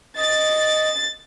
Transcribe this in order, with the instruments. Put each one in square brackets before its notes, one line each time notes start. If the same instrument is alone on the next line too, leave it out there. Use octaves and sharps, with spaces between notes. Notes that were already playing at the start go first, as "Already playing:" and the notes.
[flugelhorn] D#5 [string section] A6